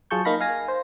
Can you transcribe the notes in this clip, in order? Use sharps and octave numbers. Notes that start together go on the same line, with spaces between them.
F#3 F4 G#4 A5 C#6 G6
A#3 D#4 F5 B5 A#6
F5 G#5 A#6
C5